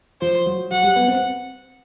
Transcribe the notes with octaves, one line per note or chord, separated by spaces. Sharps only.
F3 F4 C5
F#3 F#4
F#3 F#4 F#5
G3 G4
B3 B4
C4 C5